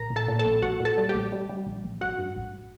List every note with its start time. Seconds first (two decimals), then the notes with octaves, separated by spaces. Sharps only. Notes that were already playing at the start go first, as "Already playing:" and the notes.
Already playing: A#1 A#4 A#5
0.10 A#1
0.16 A4 A5
0.28 A#2
0.39 A4 A5
0.45 A#1
0.62 A#1 F#4 F#5
0.80 A#2
0.85 A4 A5
0.97 G3
1.09 G4 G5
1.14 A#1
1.32 G3
1.49 G3
1.67 A#1
1.84 A#1
2.01 A1 F#4 F#5
2.19 G2
2.36 A1